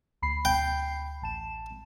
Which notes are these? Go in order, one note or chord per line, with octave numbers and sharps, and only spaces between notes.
D2 B5 C7
G5
A1 A5 E7